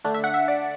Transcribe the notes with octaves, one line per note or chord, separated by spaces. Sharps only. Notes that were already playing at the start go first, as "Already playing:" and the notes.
D3 A3 D4
E5
F#5
E5
D5